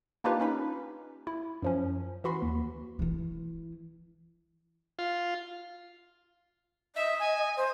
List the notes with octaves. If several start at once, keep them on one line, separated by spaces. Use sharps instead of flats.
A#3 D4 D#4 F4 G4 B4
C#4 D#4 B5
E4
F#2 F3 C#4
E3 F#4 B5 C6
D#2
E3 E4
F4
D#5 E5
G#5
C5